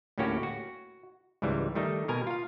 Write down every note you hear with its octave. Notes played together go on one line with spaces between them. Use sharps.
D2 A2 A#3 C#4 F#4 G4
F#4
C#2 G#2 E3 G3
D#3 G3 A3 D#4
B2 A#4 G#5 A#5
F4 F5